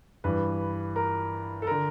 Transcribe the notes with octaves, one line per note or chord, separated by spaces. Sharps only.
G2 E3 B4
A#4
A4
D3 A#4